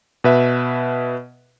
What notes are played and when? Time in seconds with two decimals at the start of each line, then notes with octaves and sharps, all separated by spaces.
0.24 B2 B4 E5